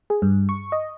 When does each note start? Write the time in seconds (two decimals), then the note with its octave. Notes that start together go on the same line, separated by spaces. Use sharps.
0.10 G#4
0.22 G2
0.49 C#6
0.72 D#5